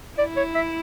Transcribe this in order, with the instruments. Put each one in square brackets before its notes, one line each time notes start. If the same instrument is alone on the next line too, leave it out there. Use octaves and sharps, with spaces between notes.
[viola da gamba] E4 [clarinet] D5
[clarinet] C#5
E5